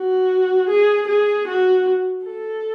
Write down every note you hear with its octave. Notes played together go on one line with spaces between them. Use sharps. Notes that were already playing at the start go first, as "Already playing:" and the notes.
Already playing: F#4
G#4
G#4
F#4
A4